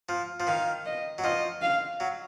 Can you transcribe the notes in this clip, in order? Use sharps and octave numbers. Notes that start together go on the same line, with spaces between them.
F3
F3
D#3 F5
D#5
F#3
F3 D#5
F5
F#3